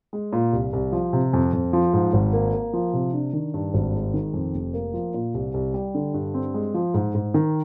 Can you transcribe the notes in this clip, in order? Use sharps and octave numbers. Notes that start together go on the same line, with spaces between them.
G#3
A#2
C2
C2
F3
C3
F2
F2
F3
G#2
G#1
A#3
A#3
F3
C3
D4
D#3
G2
G#1
G#3
D#3
F2
F1
A#3
F3
A#2
C2
C2
G3
D3
G2
C4
G#3
F3
G#2
G#2
D#3